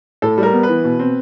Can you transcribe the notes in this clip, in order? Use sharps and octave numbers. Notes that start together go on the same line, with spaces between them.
A2 A4
G3
A#4
B3
B4
E3
B2
C4